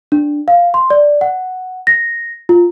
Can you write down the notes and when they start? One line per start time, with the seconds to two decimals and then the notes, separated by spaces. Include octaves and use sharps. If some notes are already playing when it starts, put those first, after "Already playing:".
0.12 D4
0.48 F5
0.74 C6
0.90 D5
1.21 F#5
1.87 A#6
2.49 F4